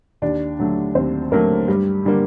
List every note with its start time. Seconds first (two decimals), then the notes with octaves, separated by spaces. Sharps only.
0.22 D#2 D4 D5
0.59 D3 F#3 A3
0.95 D#2 C4 C5
1.32 D3 F#3 A3 A#3 A#4
1.68 G2 G3 G4
2.05 D3 G3 A#3